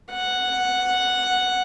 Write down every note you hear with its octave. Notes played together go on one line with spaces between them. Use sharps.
F#5